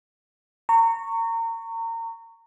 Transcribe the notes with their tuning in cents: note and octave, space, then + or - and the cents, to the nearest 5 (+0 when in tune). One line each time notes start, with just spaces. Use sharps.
A#5 -30 C#6 +0